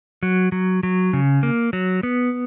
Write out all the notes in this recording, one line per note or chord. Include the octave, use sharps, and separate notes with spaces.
F#3
F#3
F#3
C#3
A#3
F#3
B3